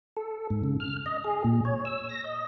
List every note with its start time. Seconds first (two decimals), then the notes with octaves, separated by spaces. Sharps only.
0.17 A4
0.50 G#2
0.64 C#3
0.80 F6
1.06 D#5
1.24 G#4
1.44 A#2
1.65 C#5
1.85 E6
2.09 A#6
2.24 D#5